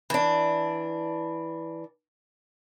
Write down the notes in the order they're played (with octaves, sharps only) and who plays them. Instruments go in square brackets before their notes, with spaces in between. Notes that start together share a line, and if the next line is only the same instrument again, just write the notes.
[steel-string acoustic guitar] E3 D4